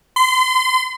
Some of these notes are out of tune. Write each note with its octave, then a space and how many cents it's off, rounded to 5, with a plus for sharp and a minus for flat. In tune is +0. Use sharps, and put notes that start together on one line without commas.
C6 -30